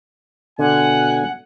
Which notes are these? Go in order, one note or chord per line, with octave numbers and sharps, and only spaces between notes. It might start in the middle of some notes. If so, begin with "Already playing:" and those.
B2 D3 F#5 G#5